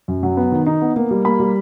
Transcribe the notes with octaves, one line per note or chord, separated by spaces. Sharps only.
F#2
F#3
B3
D#3
D#4
B3
A#3
G3
A#3 B5
G3